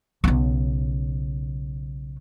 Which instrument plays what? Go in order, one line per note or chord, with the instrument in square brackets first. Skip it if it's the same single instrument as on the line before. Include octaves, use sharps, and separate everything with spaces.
[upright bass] B1 C#3